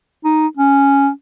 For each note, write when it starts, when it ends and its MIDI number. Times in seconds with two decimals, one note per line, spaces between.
0.25 0.47 63
0.57 1.10 61